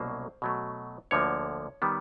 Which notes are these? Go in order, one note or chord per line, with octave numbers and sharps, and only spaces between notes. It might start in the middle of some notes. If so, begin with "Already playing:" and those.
Already playing: C2 B2 F#3 A#3 C#4 C5
B2 F#3 A3
D2 D3 F3 A#3 C#5
D#3 G3 B3